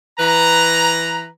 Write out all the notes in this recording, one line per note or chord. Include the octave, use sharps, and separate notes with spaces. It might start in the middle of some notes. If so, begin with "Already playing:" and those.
E3 B4 A#5